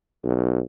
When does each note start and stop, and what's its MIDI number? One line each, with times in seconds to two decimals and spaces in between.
0.24 0.60 35